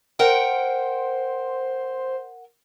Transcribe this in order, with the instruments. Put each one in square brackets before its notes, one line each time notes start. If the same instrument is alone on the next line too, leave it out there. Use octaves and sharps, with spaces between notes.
[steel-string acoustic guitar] A#4 F#5 G5 [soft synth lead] C5